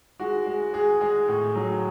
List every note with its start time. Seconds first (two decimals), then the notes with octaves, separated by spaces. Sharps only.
0.20 G#3 F#4
0.46 G#3
0.73 G#3 G#4
1.01 G#3 G#4
1.28 A2
1.55 F#3